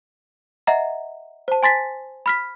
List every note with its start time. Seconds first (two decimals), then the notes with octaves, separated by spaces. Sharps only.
0.67 D#5 E5 F#5 A#5
1.48 C5 A5
1.63 G#5 C6 A6 B6
2.26 B5 F6 B6